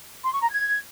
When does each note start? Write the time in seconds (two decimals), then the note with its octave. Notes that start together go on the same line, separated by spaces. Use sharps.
0.24 C6
0.33 C#6
0.42 A#5
0.50 G#6